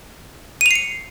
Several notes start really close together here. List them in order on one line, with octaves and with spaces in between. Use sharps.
D#7 F7 C7 C#7